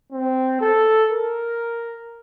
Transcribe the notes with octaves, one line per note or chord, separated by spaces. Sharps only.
C4
A4
A#4